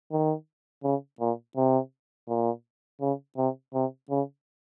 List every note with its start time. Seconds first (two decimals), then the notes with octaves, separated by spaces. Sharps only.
0.12 D#3
0.83 C#3
1.20 A#2
1.56 C3
2.28 A#2
3.01 C#3
3.37 C3
3.74 C3
4.10 C#3